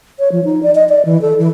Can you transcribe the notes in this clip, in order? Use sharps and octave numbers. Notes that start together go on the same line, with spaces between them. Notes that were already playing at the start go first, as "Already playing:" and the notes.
C#5
F3
D#4
D5
D#5
D5
E3
A4
E3